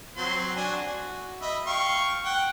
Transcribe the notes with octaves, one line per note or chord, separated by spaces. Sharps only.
F#3 C4 C6
D4 F#4 G#5
F#4
D#5 E5 B5
F5 G5 C#6
F#5 G5